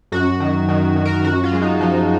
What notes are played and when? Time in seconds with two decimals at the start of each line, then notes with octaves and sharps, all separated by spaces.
0.12 F#2 F#4
0.40 D#3
0.69 D#3
0.96 D#3
1.05 A#4
1.24 F#2 F#4
1.44 F4
1.52 G#3
1.62 D#4
1.80 F3 D#4